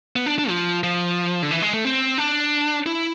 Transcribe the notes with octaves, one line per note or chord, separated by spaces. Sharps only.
B3
D4
D4
F3
F3
D3
E3
G#3
A3
C4
D4
E4